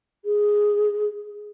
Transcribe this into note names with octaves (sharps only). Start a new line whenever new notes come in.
G#4